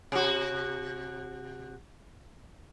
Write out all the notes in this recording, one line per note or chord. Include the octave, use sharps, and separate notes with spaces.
C3 F#4